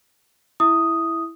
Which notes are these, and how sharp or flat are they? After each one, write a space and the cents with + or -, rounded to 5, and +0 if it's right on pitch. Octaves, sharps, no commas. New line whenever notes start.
E4 +0 E5 +0 D#6 +0